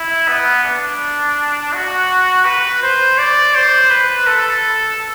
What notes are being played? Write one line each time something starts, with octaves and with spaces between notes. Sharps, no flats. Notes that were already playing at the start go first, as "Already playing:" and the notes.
Already playing: E4
B3
D4
F#4
B4
C5
D5
C5
B4
A4